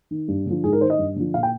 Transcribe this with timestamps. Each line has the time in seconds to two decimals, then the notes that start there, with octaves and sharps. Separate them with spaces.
0.11 D#3
0.28 G2
0.46 D3 F3
0.64 G#2 G#4
0.73 A#4
0.81 D#3 C5
0.90 D#5
0.99 G2
1.16 D3 F3
1.34 A#2 F5
1.43 G5